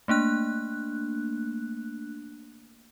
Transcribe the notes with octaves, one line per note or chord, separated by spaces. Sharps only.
A3 A#3 D4 F#6